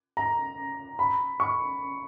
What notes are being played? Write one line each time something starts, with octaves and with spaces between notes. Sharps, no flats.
A#5
B5
C#6